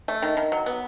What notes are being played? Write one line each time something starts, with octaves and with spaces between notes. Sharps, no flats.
A3
D#3
D#3
F#3
B3